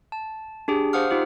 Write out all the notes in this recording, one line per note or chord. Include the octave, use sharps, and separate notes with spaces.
A5
D4 G4 G#4
C5 F5 F#5 D#6 F6
D#4 F4 G4 C5